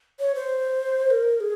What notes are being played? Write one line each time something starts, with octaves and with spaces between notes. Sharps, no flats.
C#5
C5
A#4
G#4